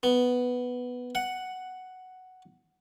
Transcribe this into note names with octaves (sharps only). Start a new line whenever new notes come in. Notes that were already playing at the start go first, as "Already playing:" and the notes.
B3
F#5